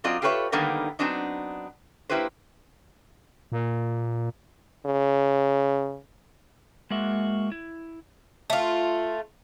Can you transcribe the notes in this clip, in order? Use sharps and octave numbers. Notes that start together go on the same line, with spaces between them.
F#3 C4 F4 D5 D#5
F4 G4 A4 B4 C#5 E5
D3 D#3 G3 A#3 B3 D#4
F#3 B3 C4 D4 D#4
A#3 E4 G4 B4 C5
A#2
C#3
G#3 A#3 F#4 E5
E4
A3 F4